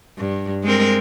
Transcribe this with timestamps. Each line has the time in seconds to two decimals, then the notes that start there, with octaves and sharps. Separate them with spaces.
0.18 G2
0.64 G#3 C4 A#4